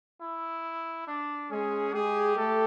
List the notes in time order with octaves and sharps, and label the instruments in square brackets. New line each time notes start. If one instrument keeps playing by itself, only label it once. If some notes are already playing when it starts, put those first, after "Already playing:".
[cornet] E4
D4
[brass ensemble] G#3 G#4 [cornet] C#4
[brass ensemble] G#3 G#4 [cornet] G4
[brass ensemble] A3 A4